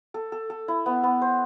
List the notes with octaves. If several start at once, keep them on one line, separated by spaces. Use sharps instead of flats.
A4
A4
A4
E4
B3
B3
C5